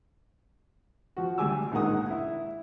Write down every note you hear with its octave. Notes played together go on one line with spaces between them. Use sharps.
F3 F#4
D2 G3 G#5 D6 E6
A#1 G#2 D#3 A#4 F#5 D#6
E4